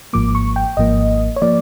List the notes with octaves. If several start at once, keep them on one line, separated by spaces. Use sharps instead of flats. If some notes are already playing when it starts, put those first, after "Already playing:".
G#1 G#2 F3 A#3 D6
C#6
G5
G#1 G#2 F3 A#3 D#5
C#5
F3 A#3 D5